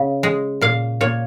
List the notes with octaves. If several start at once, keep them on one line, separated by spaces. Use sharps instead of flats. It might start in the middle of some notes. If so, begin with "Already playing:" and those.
Already playing: C#3
G#3
A#2 F5
A#2 C#5